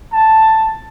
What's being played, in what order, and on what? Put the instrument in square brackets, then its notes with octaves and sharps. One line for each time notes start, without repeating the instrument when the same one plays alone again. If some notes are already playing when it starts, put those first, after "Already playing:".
[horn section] A5